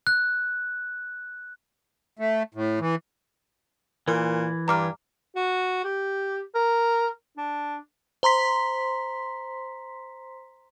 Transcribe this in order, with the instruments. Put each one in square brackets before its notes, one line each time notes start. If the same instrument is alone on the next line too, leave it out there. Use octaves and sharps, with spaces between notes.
[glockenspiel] F#6
[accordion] A3
A2
E3
[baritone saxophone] A#2 [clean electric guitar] E3 [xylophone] A#4
[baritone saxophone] G2 [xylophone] A#5 D6 F6
[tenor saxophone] F#4
G4
A#4
D4
[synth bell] C5 A#5 C6 B6